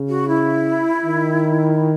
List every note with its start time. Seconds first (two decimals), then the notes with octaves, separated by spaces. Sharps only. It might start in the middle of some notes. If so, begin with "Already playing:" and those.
Already playing: C#3
0.08 F#4
0.27 E4
1.05 D#3